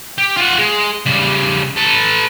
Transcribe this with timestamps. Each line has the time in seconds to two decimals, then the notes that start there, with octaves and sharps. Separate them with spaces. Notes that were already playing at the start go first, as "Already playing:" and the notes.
0.18 G4
0.37 F4 F#5
0.58 G#3
1.06 C#3 G3
1.77 A4 B4